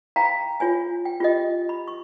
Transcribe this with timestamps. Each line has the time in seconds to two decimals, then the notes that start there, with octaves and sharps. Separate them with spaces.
0.16 F5 G5 A#5 B5
0.60 F4 C#5 G#5
1.05 G5
1.20 F4 G4 D#5
1.69 B5
1.88 C#6